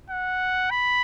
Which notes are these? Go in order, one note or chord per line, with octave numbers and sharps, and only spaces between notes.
F#5
B5